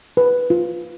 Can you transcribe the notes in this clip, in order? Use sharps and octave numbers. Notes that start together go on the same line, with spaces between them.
B4
F4